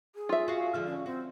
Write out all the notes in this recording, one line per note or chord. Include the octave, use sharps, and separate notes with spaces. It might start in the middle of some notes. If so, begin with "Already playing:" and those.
G#4
F4 E5
F#4 F5
D3 F3 G#3
C#4
C4 F#4